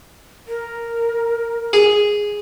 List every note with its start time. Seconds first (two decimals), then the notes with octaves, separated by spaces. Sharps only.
0.48 A#4
1.73 G#4